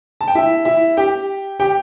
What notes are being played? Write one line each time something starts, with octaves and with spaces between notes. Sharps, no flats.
A5
G5
E4 E5
E4 E5
G4 G5
G4 G5